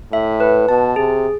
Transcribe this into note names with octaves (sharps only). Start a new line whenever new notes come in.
A2 E5
B4
B2 A5
C3 G#4